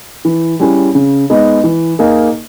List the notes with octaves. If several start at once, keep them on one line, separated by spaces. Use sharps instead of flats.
E3
G3 C#4 E4 G#4
C#3
G#3 B3 D#4
E3
A#3 D#4 G#4